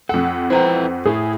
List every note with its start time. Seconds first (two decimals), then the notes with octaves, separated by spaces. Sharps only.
0.09 F2 A4 F#5
0.50 E4 B4 C5 G5 A#5
1.06 A2 E4 G#4